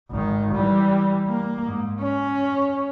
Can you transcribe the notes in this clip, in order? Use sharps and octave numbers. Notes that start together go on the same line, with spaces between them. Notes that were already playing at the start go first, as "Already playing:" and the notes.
G#1 D#3
E3 G3
A#3
G#2
C#4